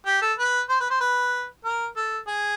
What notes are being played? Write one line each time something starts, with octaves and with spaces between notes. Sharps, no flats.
G4
A4
B4
C5
B4
C5
B4
A#4
A4
G#4